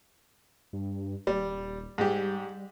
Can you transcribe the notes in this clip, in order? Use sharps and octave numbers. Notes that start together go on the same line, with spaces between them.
G2
D#1 G3
G#2 G3 G4